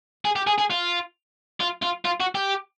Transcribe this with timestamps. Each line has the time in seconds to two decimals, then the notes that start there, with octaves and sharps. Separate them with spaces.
0.25 G#4
0.36 G4
0.47 G#4
0.58 G#4
0.70 F4
1.61 F4
1.83 F4
2.05 F4
2.20 F#4
2.35 G4